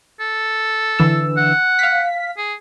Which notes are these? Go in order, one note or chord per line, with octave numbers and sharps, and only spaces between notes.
A4
D3 E3 E6
F#5
F5 B6
G#4